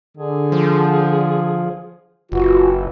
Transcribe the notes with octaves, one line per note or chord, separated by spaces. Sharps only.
D3 G#4
F3
F#1 E3 F4 F#4